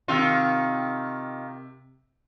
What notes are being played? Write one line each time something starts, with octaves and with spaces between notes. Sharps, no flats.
C3 D#3 F4 E6